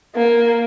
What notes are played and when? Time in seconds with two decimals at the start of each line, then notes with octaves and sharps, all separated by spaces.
0.15 A#3